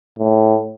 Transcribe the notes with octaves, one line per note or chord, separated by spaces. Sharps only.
A2